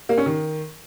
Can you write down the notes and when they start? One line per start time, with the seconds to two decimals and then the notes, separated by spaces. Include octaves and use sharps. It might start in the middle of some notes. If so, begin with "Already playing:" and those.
0.09 A#3
0.18 C#4
0.26 D#3